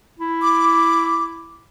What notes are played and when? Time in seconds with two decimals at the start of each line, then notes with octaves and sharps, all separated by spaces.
0.19 E4
0.42 D6